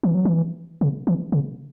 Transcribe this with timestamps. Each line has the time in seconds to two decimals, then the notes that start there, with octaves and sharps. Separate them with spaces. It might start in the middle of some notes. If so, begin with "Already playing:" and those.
0.03 E3
0.15 F#3
0.25 E3
0.81 C#3
1.07 E3
1.32 C#3